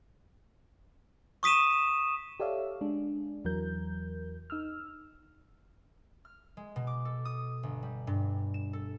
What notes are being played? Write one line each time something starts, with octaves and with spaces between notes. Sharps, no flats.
C#6 D#6 B6 D#7 E7
G4 A4 C#5 D5 E5 F5
G#3 D4 G#4
E2 E3 F#3 A#4 G6
D#4 E6 F6
F6
G#3
B2
D6
A4
D#6
G1
G3
G2
E7
A4